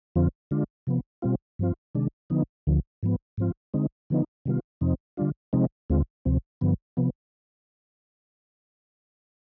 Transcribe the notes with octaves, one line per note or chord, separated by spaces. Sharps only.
F2 D3 F3 C4 F4
D3 G#3 D4 F4
C3 F3 B3
B2 G3 C4 F4
G2 F3 C4 F4
C3 D#3 G#3 D4
D3 F3 B3 D#4
D2 D3 F3
G#2 F3 B3
G#2 F3 C4 F4
D3 G#3 C4 D#4
D3 F3 B3 D#4
C3 D#3 G3 B3 F4
F2 C3 F3 C4 D#4
D3 G3 D4 F4
C3 F3 G#3 C4 D#4
D#2 D3 G#3 C4 F4
D2 C3 F3 C4
G2 D3 F3 B3
C3 F3 B3